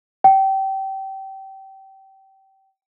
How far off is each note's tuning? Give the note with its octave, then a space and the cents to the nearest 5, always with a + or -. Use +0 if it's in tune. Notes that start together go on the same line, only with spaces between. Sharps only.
G5 -25